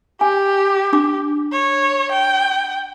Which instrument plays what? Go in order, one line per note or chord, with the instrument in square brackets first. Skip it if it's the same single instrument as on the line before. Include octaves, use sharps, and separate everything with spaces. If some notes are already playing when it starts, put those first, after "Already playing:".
[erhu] G4 [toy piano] G#5
[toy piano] D4 D6
[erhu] C#5
G5